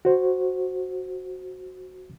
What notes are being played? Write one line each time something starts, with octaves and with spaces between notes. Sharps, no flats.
F#4 C5